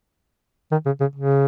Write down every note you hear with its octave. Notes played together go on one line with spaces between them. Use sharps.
D#3
C#3
C#3
C#3